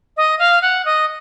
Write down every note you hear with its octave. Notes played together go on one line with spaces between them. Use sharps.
D#5
F5
F#5
D#5